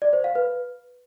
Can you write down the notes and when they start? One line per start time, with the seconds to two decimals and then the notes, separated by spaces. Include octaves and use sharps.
0.02 D5
0.13 C5
0.24 F5
0.35 B4